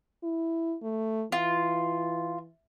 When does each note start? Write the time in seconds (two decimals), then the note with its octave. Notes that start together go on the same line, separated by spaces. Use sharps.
0.24 E4
0.83 A3
1.32 E3 F4